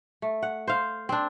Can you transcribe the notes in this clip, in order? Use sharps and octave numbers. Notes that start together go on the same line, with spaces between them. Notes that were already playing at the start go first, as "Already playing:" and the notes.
A3
F#5
C5 F5
C4 D4